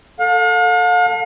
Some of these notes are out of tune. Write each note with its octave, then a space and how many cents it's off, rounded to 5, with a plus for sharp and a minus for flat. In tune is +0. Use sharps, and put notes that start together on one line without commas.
A4 +10 F5 +45